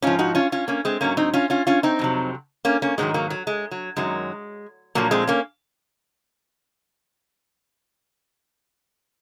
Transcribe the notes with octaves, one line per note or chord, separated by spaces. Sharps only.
G#2 F3 C#4 F4
D#4 F#4
C#4 F4
C#4 F4
A#3 C#4
G#3 C4
G#2 F#3 A#3 C#4
C4 D#4
C#4 F4
C#4 F4
C#4 F4
C4 D#4
F2 C3 F#3
A#3 C#4
A#3 C#4
G#2 D#3 F#3 G#3 C4
F#3 A#3
F#3
G#3
F#3
F#2 D#3 F#3 G#3
A#2 F3 F#3 A#3
G#3 C4
A#3 C#4